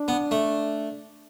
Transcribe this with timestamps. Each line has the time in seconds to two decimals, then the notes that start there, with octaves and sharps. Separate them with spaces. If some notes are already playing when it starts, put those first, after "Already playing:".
Already playing: D4
0.08 B3
0.31 A3